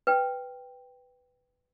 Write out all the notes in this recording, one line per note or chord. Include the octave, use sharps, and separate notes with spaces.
B4 G5